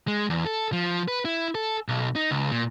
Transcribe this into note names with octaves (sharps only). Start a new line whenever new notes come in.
G#3
E2
A4
F3
B4
E4
A4
B1
D#4
C#2
A#2